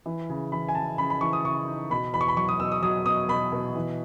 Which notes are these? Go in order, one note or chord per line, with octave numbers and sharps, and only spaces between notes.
E3
C#3
E3 B5
G#5
C#3 A5
C#3 B5
B5
E3 C#6
D#6
C#3 C#6
D#4
B2 B5
E2 B5
C#6
B5
F#3 C#6
D#6
B2 E6
D#6
F#3 D#6
B2 D#6
B2 B5
B2
E3